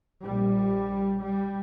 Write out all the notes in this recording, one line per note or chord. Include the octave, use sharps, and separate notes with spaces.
A#1 A#2 G3
G3